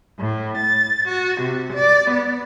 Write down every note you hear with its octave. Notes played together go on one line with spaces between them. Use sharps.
A2
A6
F#4
C3
D5
B3